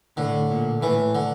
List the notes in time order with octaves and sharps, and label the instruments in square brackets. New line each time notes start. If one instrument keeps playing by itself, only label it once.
[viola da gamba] A2 [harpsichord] D3
[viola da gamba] A#2
[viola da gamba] A2 [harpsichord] E3
[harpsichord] D3